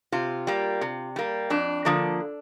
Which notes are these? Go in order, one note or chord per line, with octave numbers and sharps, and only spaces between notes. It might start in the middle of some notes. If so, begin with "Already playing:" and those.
C3 F4
G3 A#3
C3
G3 A#3
F2 D4
D3 F3 A#3